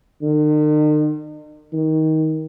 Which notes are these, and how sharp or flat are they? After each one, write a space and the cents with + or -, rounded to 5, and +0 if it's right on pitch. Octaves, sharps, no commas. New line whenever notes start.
D#3 -45
D#3 +20